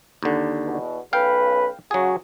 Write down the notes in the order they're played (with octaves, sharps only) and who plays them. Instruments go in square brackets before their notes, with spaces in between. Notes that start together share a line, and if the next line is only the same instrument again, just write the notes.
[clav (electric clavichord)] D#2 D3
[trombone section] E2 B2
[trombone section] B1 C#3 B4 [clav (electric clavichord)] F5 G5
[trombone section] C#3 F#4 [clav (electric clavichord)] F#3 G#4